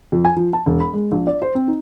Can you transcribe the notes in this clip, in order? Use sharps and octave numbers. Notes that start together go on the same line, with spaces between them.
F2
G#5
F3
A5
E1
B5
G#3
A#1
D5
C5
C4
D#4